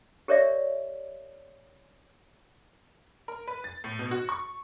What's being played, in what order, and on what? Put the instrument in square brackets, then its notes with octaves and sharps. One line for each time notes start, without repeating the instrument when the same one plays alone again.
[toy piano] G4 A#4 C#5 D5 E5
[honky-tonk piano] A#4
B4
A6
A2
B2
F#4
C#6